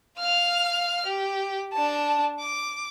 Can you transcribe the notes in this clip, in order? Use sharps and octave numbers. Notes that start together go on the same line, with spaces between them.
F5 F6
G4
D4 A5
D6